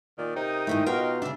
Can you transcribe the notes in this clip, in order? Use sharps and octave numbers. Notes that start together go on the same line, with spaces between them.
A#2 D#3 D5
C3 D#4 A#4 G5 D#6
G#2 D#3 A3 E4
B2 D#4 F4 F#4 A#4 D#5 G5
C#3 D4 E5